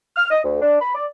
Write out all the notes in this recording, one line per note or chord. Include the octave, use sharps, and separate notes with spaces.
F6
D#5
D2
D4
B5
D5